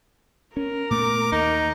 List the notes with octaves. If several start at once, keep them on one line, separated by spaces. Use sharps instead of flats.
C#4 A#4
A#2 A3 B3 D6
D#2 A#3 D#4